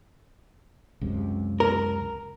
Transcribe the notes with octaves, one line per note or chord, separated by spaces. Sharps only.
C#2 F#2 C3
A#4